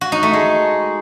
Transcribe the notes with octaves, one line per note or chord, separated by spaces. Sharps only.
F#4
D#4
A3
G#3